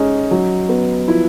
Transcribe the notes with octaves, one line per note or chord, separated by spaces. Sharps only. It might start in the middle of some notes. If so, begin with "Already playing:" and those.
Already playing: G#3 C#4 D#4
F#3
B3
F3 E4